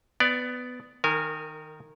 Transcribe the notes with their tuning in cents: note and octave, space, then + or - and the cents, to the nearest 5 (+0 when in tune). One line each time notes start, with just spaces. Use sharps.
B3 +15 D5 +0
D#3 +0 A#4 -25 G#5 +0